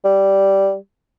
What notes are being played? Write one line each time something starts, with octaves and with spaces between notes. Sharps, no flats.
G3